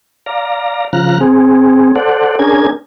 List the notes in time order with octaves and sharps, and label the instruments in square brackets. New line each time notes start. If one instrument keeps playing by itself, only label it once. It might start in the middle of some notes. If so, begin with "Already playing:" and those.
[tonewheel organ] D5 F5 A#5
C#3 F3 A#5 F6 F#6
C4 G#4
A4 C5 D5 F#5
C#4 D4 G#4 A#4 G#6